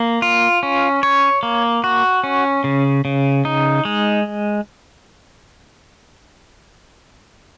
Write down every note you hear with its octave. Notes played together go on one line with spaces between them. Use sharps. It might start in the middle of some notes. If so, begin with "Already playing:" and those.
Already playing: A#3
F4
C#4
C#5
A#3
F#4
C#4
C#3
C#3
D#4
G#3